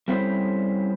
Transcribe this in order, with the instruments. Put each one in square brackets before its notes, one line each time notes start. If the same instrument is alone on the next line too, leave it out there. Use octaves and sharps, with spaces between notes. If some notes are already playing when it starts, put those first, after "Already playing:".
[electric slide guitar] G3 A3 C4 C#4 E4 C5